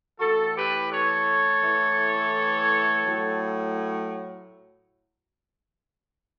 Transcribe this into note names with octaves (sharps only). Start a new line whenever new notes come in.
A2 E3 F#4 A4
G4 B4
A4 C#5
A2 E3
A2 F#3